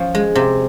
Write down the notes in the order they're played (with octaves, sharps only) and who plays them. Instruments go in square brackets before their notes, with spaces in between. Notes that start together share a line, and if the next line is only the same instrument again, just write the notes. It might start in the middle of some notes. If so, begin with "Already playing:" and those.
Already playing: [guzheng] F3 C#4
G#3
C3